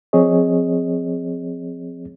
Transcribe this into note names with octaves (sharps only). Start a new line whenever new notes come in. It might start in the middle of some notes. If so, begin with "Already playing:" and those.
F3 C4 G#4 C#5 D#5